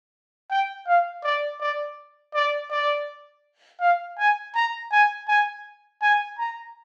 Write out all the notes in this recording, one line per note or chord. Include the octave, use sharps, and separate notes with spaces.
G5
F5
D5
D5
D5
D5
F5
G#5
A#5
G#5
G#5
G#5
A#5